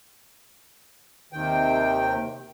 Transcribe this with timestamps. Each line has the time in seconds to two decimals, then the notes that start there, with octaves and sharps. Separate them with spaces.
1.33 D#2 C3 D#3 G5